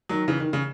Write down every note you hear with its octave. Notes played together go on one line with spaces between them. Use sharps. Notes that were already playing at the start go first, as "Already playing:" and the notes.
D#3 F#3
C#3 E3
D#3
C#3